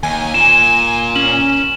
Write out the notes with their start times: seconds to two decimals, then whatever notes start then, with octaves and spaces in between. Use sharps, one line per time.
0.03 D#2 G#5
0.34 A#2 E7
1.16 C#4 F#7